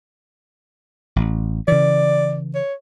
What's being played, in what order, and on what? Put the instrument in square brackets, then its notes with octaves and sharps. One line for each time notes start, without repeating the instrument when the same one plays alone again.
[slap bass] A1
[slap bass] C#3 E3 [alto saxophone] D5
[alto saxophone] C#5